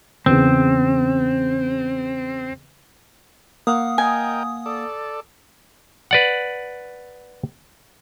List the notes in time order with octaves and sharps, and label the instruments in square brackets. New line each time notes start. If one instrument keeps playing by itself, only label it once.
[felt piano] E2 C#3 [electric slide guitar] C4
[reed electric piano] A#3 F5 F#5 [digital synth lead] D#6
[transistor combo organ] A#4 D#5 G5 [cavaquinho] G#5
[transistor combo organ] A4 D5
[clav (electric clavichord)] B4 D5 F#5